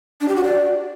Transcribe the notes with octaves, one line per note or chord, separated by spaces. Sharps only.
D4
G4
F#4
D5